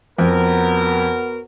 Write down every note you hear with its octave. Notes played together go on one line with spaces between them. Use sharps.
F2 B3 F#4 A#4